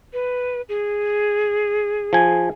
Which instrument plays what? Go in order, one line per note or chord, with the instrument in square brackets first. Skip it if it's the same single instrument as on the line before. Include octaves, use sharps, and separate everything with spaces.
[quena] B4
G#4
[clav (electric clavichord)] F3 G#5